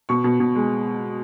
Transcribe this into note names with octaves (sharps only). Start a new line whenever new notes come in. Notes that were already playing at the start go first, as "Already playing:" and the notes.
B2 C#6
B2
B2
G#3